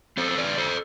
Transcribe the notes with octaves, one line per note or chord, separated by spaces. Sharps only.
C4 A4 C5
C5
B4 D5
D3
A4 C5